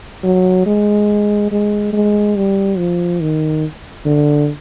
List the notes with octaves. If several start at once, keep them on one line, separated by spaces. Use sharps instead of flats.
F#3
G#3
G#3
G#3
G3
F3
D#3
D3